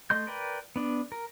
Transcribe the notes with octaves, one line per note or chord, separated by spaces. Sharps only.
A3 D#5 C6 G6
A#4 B4 D5 G5
B3 D4
A#4